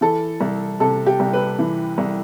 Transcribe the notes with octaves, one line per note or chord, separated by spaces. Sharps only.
E3 A4
C2
C3 A4
G4
C2
B4
E3
C2